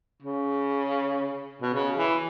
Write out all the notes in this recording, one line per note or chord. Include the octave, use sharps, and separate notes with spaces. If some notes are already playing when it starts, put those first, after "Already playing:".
C#3
B2
C#3
E3